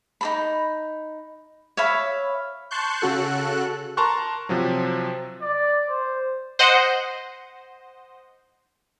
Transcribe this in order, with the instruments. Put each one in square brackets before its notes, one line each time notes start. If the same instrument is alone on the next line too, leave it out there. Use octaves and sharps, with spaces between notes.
[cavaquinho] D#4 A4 B5
C#5 E5 F5 B5
[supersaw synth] A5 C6 C#6 F#6 G6
C#3 F#4 A4 F#6
[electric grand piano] A#4 A5 A#5 C6 C#6 F#6
C3 F3 F#3
[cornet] D5
C5
[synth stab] C5 D#5 F#5